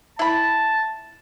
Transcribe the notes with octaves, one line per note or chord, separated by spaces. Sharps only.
E4 A5 B5